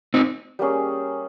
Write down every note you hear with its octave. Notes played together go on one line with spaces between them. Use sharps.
C4 D#4
G3 A#3 C#4 G#4